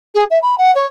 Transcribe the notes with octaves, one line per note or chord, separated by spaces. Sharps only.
G#4
E5
B5
F#5
C#5